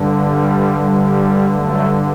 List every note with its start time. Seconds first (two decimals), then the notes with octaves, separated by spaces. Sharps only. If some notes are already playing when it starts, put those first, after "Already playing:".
Already playing: G2 D3
0.11 G3
0.82 G3
1.54 F#3 A3